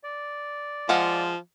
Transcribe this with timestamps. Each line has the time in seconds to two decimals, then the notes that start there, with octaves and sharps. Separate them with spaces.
0.04 D5
0.89 F3 G#3 F5 F#5